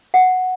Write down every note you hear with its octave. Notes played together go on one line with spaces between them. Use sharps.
F#5